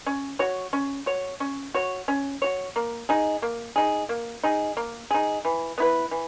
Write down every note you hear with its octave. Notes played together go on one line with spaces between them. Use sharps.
C#4
F#4 C#5
C#4
F#4 C#5
C#4
F#4 C#5
C#4
F#4 C#5
A#3
D#4 G#4
A#3
D#4 G#4
A#3
D#4 G#4
A#3
D#4 G#4
E3
B3 E4 B4
E3